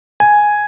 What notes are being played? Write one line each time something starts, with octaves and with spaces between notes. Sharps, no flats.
G#5